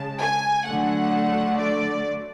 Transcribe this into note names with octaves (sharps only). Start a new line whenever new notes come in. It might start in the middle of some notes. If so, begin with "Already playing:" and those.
Already playing: C#3 G#3 A5
G#5
D3 F#3 A3 F#5
D5